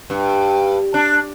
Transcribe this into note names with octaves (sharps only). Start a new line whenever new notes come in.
G2
D4